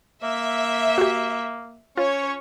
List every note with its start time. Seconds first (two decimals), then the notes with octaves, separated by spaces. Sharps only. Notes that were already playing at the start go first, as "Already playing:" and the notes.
0.23 A#3 E5
0.98 F#4 G4
1.97 C#4 F4 C#5